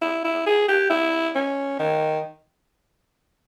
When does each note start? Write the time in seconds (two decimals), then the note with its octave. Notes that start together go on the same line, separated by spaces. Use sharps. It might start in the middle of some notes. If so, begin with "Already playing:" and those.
0.02 E4
0.24 E4
0.47 G#4
0.69 G4
0.90 E4
1.35 C#4
1.79 D#3